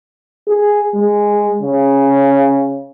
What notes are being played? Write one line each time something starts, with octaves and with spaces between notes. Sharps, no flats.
G#4
G#3
C#3